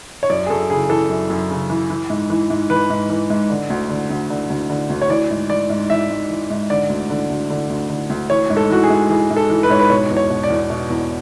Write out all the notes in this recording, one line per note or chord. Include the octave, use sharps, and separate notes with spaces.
C#5
F#2 D5
G#4
F#2 A4
C#3 G#4
E3 A4
F#2
F#2
C#3
E3
E3
G#2
E3
G#2
E3 B4
G#2
E3
G#2
D3
D2
D3
D2
D3
D2
D3
D2
C#5
E3 D5
G#2
E3 D5
G#2
E3 E5
G#2
E3
G#2
D3 D5
D2
D3
D2
D3
D2
D3
D2
E3 C#5
G#2
A4
E3 F#4
G#4
G#2
E3 G#4
G#2
A4
E3
B4
G#2 C#5
B4
B2 C#5
E2
C#5
B2
D5
E2
B2
E2